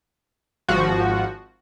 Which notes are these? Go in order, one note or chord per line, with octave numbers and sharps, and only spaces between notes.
G#1 F3 F#4